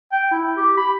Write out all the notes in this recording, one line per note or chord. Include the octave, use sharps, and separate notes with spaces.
G5
E4
G4
B5